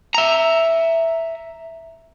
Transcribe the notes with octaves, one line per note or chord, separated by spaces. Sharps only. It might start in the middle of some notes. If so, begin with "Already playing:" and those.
E5 A#5